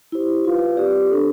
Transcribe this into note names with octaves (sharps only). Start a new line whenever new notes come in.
E4 G4 C5
F4 B4 F5
C4 G4 D5
D4 A4 C5